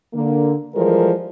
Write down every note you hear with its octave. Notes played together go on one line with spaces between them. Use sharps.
D3 A#3
E3 F3 G3 G#3 A4 A#4